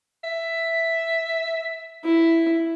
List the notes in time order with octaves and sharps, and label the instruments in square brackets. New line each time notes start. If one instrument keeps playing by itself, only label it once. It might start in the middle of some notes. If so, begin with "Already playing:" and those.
[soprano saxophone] E5
[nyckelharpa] E4